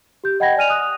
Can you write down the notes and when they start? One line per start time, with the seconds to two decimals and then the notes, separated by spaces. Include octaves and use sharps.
0.24 G4 G6
0.40 D#5 F#5 G5 B5 G#6 A#6
0.57 D5 G#5 F6 D#7 F7
0.70 D#6 F#6